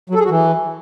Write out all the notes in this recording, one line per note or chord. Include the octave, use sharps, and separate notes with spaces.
F#3
A4
G#4
F#4
E3